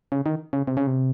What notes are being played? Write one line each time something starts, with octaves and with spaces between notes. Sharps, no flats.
C#3
D#3
C#3
C3
C#3
C3